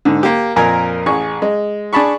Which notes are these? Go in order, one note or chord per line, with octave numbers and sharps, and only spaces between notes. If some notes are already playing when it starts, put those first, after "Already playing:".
G#2 D3
A#3 G4
F2 A#2 A#4 G#5 A#5
A1 G#4 C#6
G#3
D4 G#4 A5 B5 C#6